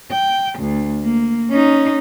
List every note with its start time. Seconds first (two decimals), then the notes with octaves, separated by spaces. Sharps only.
0.11 G5
0.59 D2
1.04 A#3
1.49 C#4 D#4